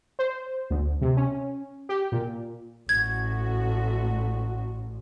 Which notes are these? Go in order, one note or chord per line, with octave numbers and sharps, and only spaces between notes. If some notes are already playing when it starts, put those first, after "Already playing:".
C5
D2
C3
C#4
G4
A#2
A1 A3 F#4 G#6